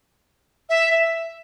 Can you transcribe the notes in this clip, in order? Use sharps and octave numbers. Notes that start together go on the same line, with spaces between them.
E5